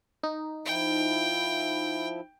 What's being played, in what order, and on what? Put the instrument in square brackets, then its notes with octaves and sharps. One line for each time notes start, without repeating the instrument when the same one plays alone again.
[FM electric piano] D#4
[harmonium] F3 E4 [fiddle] G5